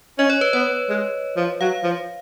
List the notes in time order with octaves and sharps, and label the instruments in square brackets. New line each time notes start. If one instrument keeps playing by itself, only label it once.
[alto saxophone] C#4 [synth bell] D#5
[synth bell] C#5
B4
[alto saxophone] B3 [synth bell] C#5
[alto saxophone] G#3
F3
[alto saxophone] F#3 [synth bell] F5
[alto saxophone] F3